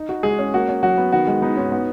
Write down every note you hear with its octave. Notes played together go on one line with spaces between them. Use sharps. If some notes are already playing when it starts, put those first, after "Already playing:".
Already playing: D#4
F#4
G#3 G#4
C#4
A#3 F#4
C#4
F#3 F#4
B3
D#3 F#4
G#3
B3 D#4
G#2 C#4
B3